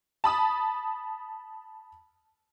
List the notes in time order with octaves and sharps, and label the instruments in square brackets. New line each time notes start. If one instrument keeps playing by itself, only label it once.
[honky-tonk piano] A5 B5 D#6